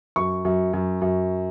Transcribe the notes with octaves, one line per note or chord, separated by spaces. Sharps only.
F#2 C#6
F#2
F#2
F#2